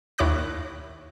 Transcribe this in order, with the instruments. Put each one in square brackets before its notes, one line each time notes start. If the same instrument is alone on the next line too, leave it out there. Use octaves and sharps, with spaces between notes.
[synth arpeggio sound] D#2 E4 C#5 D6 F#6 A#6